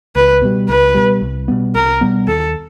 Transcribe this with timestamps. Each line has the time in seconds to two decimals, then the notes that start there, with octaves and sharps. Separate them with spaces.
0.15 C#2 B4
0.42 B2 G3
0.69 C#2 B4
0.95 B2 G3
1.21 C2
1.48 B2 G3 B3
1.75 C2 A#4
2.01 B2 G3 B3
2.28 D#2 A4